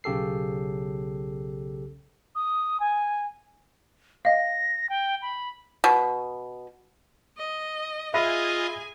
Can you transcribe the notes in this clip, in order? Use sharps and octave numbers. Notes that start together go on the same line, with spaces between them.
B1 C#3 G4 A4 C7
D#6
G#5
D#5 F5 A#6
G5
B5
B2
D#5
F4 G#4 D#5 E5 G#5 B5 A#6